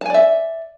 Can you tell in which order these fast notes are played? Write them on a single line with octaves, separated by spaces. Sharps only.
A5 G#5 D5 E5